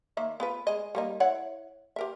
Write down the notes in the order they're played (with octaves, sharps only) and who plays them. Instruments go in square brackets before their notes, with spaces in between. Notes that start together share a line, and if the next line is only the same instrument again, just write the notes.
[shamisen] D#3 A#3 E5
B3 F4 B4
G#3 D#5
G3 A#3 D#4
E4 C#5 F#5
G4 A#4 E5